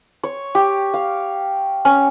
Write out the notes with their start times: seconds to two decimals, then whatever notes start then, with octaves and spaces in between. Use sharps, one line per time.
0.24 C#5
0.55 G4
0.94 F5
1.85 C#4